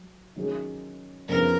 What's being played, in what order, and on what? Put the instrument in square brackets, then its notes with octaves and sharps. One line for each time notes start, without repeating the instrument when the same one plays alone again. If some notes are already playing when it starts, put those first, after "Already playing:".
Already playing: [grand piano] F#3
D#3 F#3 C#4 G#4 C#5
[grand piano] F2 C#3 F3 B3 D#4 [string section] A#4